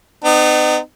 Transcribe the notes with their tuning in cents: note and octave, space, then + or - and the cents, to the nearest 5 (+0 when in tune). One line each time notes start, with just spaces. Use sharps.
B3 +40 D#4 -30